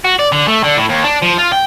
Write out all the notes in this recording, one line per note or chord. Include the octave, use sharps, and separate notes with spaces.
F#4
D5
D3
A3
D3
A2
D#2
D4
F3
F4
G5